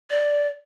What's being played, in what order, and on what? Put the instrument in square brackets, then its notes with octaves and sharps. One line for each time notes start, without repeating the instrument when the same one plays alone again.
[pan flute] D5